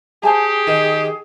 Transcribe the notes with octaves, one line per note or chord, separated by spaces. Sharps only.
G4 G#4 C5 G#5 A5
D#3